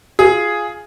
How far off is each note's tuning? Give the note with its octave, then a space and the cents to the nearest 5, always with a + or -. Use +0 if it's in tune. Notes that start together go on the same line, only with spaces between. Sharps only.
F4 +0 G#4 +0